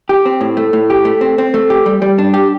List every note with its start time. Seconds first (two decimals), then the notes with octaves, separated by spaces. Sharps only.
0.09 G4
0.25 C4
0.41 A2
0.57 A3
0.73 A2
0.90 G4
1.05 A3
1.21 C4
1.38 C4
1.54 A3
1.70 G4
1.86 G3
2.02 G3
2.18 D4
2.34 G4